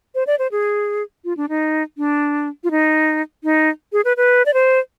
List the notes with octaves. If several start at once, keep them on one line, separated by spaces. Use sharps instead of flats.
C5
D5
C5
G#4
F4
D4
D#4
D4
F4
D#4
D#4
G#4
B4
B4
D5
C5